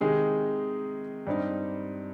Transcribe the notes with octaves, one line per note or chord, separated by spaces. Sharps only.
C3 D#3 G#3 D#4 G#4
G2 G3 C4 D#4